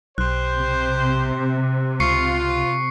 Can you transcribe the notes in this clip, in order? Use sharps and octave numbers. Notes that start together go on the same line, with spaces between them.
B1 G4 C5 F#6
C3
C#2 F4 C#6 C7 C#7